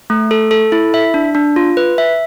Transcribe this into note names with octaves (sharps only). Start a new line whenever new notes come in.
A3
A4
A4
E4
E5
D4
D4
F4
B4
E5